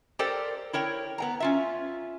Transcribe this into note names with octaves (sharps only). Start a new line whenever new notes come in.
G4 A4 A#4 C5 D5 G5
E4 A#4 C#5 G5
B3 G5 A#5
C#4 F4 E5